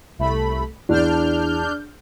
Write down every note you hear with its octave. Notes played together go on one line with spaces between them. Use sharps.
C2 A3 B5
E2 D4 F6 G6